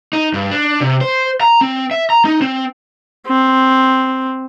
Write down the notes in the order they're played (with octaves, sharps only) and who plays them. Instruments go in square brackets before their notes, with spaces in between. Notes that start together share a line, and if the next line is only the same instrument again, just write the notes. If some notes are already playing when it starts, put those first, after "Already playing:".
[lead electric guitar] D#4
G2
D4
C3
C5
A#5
C4
E5
A#5
D#4
C4
[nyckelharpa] C4